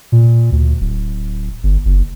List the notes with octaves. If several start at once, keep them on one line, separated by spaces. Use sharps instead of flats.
A#2
D2
D1
G1
F#1